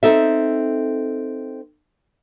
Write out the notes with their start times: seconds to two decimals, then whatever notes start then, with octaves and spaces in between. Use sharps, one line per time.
0.03 C4 D#4 A4 E5